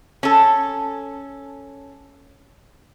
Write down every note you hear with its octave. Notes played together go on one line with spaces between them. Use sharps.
C#4 A4